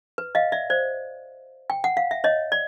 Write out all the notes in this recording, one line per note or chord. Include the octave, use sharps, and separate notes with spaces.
B4
D#5 F5
D5 E5
C5 D5
G5
F#5
F5
E5
C#5 D#5
D5